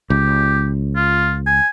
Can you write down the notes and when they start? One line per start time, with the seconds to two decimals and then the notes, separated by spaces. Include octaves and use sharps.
0.10 C#2 G4
0.96 F4
1.46 G#5